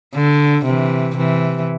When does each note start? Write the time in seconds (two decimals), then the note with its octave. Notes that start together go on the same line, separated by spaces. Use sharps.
0.15 D3
0.65 C3 E3
1.16 C3 E3